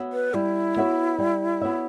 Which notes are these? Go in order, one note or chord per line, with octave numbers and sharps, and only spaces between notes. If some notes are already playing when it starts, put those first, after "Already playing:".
Already playing: B3 F#4 C#5 E5
B4
G3 E4
B3 F#4 C#5 E5
G3
B3 F#4 C#5 E5